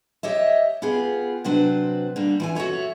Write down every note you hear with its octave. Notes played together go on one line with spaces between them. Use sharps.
G4 C#5 D#5 E5
B3 F4 G4 G#4
C3 F#3 D4 B4 C5
D3 G3 A#3
E3 F4 G#5
F#4 A4 B4 C#5 E5